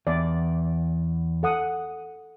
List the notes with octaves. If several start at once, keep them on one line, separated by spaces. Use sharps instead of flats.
E2 D5
A4 F#5 D#6